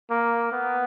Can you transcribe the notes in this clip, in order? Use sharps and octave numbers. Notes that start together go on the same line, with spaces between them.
A#3
B3